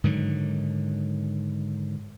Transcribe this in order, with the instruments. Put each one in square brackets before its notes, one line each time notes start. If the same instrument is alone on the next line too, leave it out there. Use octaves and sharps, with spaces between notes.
[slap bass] G#2 D3 D#3 F#3